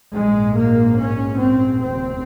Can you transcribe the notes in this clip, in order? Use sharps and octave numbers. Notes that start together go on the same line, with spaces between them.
A#1 G#2 G#3
A#3
C#4
C4
F1 D#2 C#3 C4